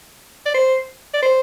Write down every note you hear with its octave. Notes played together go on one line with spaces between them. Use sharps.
D5
C5
D5
C5